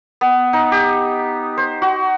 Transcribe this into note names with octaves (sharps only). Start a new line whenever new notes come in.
B3
D#4
G4
C5
F#4